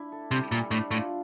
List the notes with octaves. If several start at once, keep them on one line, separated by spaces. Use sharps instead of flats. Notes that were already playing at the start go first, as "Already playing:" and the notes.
Already playing: D4 E4
A4
C3 G3
A#2 G3
A2 D4
A2 F4